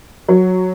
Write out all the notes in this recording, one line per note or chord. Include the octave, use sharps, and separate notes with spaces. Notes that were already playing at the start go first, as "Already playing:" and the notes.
F#3